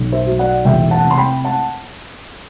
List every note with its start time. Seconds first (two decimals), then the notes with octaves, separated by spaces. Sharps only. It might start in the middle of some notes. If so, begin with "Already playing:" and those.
Already playing: B1
0.12 C5 E5
0.26 F#3
0.39 D5 F#5
0.65 E1 E5 G5
0.91 F#5 A5
1.05 C3
1.11 C6
1.17 G5 B5
1.44 F#5 A5